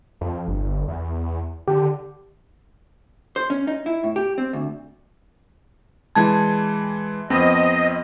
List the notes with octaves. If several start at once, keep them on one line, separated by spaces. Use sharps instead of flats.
F2
G1
E2
D3 G4
C5
C#4
D#4
E4
A2
G4
C4
D2
E3 G#3 A5 G#6
F2 B3 C4 D#5